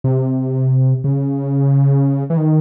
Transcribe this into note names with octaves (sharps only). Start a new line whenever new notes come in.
C3
C#3
E3
D#3